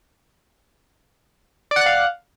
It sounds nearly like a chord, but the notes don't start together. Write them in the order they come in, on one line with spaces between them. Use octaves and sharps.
D5 F#5 F#6 F5